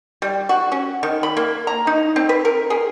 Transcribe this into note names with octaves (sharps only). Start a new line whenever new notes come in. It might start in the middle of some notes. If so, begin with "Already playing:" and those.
G3
F#4
C#4
D#3
B5
A#3
A#5
D#4
C4
B4
A#4
G#4